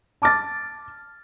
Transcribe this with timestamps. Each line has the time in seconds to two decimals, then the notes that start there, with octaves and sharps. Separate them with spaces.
0.22 A5 D6 F6 A6